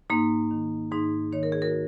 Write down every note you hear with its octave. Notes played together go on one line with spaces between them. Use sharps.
G#2 A#3 D#4
D#3
G#2 D#4 G#4
D#3 C#5
A#4
G#4
F#4 A#4